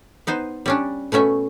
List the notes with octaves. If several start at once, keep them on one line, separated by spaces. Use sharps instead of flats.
B3 D#4 C5
G3 C#4 D4
B2 A3 C#4 E5